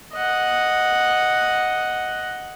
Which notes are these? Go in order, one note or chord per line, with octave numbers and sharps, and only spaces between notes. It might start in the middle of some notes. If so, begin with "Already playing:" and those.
D#5 F#5